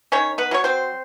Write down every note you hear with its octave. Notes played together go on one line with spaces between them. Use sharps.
D#3 C#4 C#5
B3 B4
F#3 A3 C#5
C4 C5